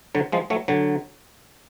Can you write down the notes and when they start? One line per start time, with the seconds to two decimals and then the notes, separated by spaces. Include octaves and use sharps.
0.15 D3 F#3
0.32 F3 G#3
0.50 F#3 A3
0.68 D3 F#3